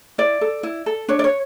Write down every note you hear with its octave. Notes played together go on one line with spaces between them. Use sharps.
E4 D5
A4
E4
A4
D4 C#5
D5
C#5